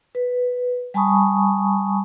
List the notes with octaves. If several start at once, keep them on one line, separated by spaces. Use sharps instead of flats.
B4
G3 G#5 A5 B5 C#6 D#6